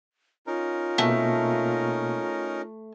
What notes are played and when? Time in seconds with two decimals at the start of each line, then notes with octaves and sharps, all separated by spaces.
0.47 C#4 D#4 F4 A#4
0.98 B2 A3 A#3